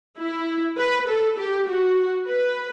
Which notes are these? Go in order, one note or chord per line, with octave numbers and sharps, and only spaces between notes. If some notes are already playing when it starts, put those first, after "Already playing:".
E4
B4
A4
G4
F#4
B4